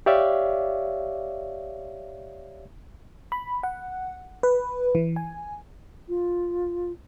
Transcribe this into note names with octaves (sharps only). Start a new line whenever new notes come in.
G4 C#5 D5 E5 F5
B5
F#5
B4
E3
G#5
F4